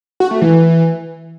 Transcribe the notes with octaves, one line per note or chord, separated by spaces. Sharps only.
F#4
A3
E3